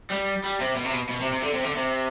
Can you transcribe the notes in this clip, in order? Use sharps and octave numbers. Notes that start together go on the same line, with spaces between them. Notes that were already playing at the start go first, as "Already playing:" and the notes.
G3
G3
C3
B2
C3
B2
B2
C3
C3
D3
C3
D3
C3